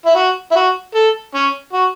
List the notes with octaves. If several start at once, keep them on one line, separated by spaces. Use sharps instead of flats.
E4
F#4
E4
F#4
A4
C#4
F#4